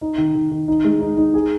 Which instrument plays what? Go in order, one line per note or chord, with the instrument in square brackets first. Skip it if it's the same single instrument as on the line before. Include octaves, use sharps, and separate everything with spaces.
[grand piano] D#4
D#3
D#3
D#3
D#4
G#3
D#4
D#4
G#4